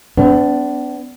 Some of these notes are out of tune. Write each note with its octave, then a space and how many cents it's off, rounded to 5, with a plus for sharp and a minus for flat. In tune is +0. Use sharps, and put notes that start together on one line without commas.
B3 +35 D4 -20